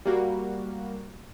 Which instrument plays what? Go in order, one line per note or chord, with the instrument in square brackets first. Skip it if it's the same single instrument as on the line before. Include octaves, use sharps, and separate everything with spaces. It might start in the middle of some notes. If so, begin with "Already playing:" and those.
[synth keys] G3 A#3 F#4